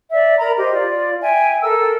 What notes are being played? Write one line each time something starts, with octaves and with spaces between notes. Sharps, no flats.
D5 E5
A#4 A#5 B5
G4 C5 D#5
F4 D5
E5 G5 G#5
A4 A#4 E6